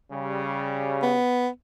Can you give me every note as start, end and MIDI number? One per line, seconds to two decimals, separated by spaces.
0.12 1.19 49
0.12 1.19 55
1.03 1.48 59